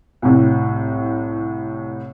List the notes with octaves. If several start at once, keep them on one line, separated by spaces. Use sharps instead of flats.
C2 A2